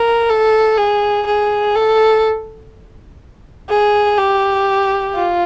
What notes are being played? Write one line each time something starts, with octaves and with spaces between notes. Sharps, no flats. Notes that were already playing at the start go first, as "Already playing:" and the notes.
Already playing: A#4
A4
G#4
G#4
A4
G#4
G4
F4